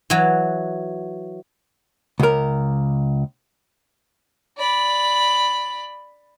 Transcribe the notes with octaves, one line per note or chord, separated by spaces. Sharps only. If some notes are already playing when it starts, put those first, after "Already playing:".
E3 F#3
C#2 A#4
D5 B5